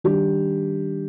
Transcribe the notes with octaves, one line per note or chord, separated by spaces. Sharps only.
D#3 G3 D4 G4